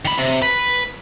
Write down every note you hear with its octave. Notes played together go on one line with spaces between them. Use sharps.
D#3 B5
C3
B4